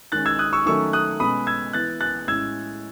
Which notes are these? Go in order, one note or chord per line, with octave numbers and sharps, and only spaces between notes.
D#3 G#3 C#4 F#6 A6
E6 G#6
D#6 F#6
C#6 E6
D#3 F#3 A3 C#4 C#6 E6
D#6 F#6
B2 G#3 C#4 B5 D#6
E6 G#6
E3 B3 F#6 A6
F#6 A6
A2 G#3 C#4 E6 G#6